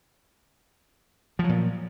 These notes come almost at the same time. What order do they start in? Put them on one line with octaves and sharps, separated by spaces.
F3 F#3 A#2